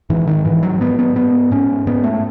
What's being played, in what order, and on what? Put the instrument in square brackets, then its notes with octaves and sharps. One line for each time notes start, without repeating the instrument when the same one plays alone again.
[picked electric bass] G#2 E3
D#3
G#2 E3
F#3
G#2 B3
B3
G#2 B3
G#2 C#4
G#2 B3
A3